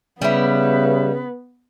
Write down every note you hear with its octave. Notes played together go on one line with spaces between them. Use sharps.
C#3 G3 B3 E4 B4